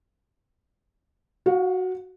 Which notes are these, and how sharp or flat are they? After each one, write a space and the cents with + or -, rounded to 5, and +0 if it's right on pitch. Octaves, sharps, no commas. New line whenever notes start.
F#4 +0 F5 +35